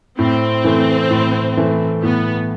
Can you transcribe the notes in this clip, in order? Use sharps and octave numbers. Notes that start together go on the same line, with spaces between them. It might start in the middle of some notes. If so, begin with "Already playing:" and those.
A2 C4
E3 A3
A2
E3 A3
A2 B3